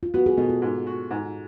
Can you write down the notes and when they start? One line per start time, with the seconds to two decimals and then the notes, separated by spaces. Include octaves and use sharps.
0.03 F4
0.14 B3 F#4
0.26 G#4
0.38 B2 A4
0.50 F4
0.62 G#2
0.87 F#4
1.11 G#2